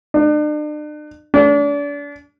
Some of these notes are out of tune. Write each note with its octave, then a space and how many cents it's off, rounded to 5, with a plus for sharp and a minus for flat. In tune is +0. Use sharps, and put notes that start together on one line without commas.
D4 +40
D4 -35